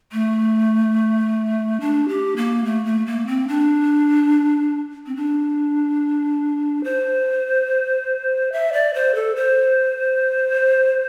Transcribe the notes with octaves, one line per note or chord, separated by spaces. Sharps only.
A3
D4
G4
A#3
A3
A3
A#3
C4
D4
C4
D4
C5
E5
D5
C5
A4
C5